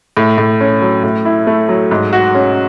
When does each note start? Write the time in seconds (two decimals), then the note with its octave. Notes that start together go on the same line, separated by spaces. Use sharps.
0.17 A2
0.38 A2
0.61 C#4
0.82 F#3
1.04 A2
1.25 E4
1.47 A3
1.69 F#3
1.91 G#2
2.13 F#4
2.35 C#4